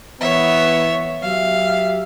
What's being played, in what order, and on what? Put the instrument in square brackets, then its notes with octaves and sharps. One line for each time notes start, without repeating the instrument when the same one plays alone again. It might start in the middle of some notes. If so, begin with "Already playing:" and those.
[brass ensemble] E3 B3 [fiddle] C#5 E5
[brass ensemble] F#3 G4 E5 [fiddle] F5